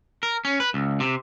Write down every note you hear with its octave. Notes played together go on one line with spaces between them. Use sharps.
A#4
C#4
B4
C#2
C3